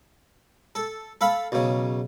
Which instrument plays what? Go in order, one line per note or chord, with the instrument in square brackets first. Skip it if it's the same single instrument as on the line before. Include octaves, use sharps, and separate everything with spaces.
[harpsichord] A4
A4 F5 B5
B1 C#3